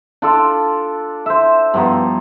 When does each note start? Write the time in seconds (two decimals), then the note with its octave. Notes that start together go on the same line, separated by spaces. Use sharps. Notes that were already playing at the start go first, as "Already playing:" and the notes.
0.22 D4 F4 A4
1.26 C5 E5
1.74 G2 F3 B3 A#5